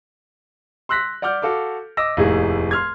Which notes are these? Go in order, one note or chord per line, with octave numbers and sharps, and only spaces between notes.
C6 E6 F#6 A#6 B6
D5 F#5 D6 F6 G6
F#4 A4 F5 D6
D#5 D6 E6 A#6
F1 D#2 A2 D#4 G#4
C6 F6 G#6